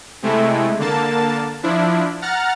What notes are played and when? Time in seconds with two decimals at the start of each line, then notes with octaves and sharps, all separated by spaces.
0.22 C3 G#3 A3 E4
0.79 D3 A#3 A5 A6
1.63 F3 D4 E4
2.22 F#5 A#5 F6 A6